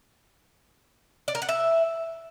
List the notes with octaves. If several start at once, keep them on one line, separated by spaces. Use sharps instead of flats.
D5
A#4
F#5
E5